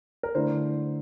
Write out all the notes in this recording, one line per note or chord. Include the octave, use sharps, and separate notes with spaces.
A#4
D3 A3 E4 C5